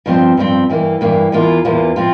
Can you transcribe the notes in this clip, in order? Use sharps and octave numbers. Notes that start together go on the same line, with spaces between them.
G2 F3 C4
G2 F3 C4
G2 E3 A#3
G2 E3 A#3
E2 E3 A#3 F4
E2 E3 A#3 F4
F3 C4 F4